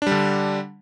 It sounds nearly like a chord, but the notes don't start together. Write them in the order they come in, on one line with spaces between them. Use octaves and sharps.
D4 G3 D3